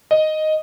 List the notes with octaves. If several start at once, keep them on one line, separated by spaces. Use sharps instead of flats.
D#5